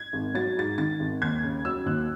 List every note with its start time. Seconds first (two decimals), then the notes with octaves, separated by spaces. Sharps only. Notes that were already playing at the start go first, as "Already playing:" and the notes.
Already playing: G#6
0.13 G#1
0.35 F#3 A6
0.57 G#2 A6
0.78 D#3 A6
1.00 G#1
1.22 D#2 G#6
1.43 C#3
1.65 F#3 E6
1.86 D#2 F#6